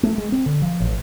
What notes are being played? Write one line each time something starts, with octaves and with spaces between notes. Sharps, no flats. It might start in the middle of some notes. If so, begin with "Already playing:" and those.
A3
G#3
C4
D3
F3
A1